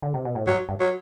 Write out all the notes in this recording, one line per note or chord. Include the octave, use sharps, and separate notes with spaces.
D3
C3
B2
A2
G2 F#3
G2
F#3